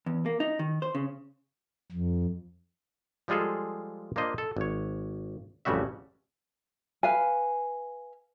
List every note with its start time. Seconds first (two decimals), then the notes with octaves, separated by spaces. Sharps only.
0.06 E2
0.26 A#3
0.40 D#4
0.59 D#3
0.82 C5
0.95 C#3
1.92 F2
3.28 F3 G3 G#3 F4 G#4 A4
4.16 A#3 D4 F4 C5 D#5
4.38 A4
4.57 G#1 C#5
5.65 A1 F2 C#3 G3 F#4 E5
7.03 B4 F5 G#5